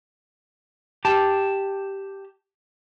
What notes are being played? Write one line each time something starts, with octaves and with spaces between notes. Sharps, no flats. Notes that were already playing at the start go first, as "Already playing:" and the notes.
G4 A5